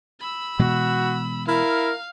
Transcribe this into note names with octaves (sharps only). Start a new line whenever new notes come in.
B5 E6
B2 E3 G#3 F#4
E4 A#4 F5